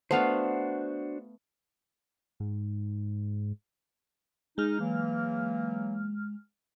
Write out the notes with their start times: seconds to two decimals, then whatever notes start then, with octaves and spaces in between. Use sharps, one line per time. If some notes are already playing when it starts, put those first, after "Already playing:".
0.11 A3 B3 D4 F#4 C5 F5
2.40 G#2
4.58 G#3 D#4 F6
4.80 E3 F#3 A#3